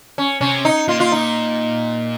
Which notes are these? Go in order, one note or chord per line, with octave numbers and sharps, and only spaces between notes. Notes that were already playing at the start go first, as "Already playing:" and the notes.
C#4
C3 C#4
D#4
A#2 F4
F4
D#4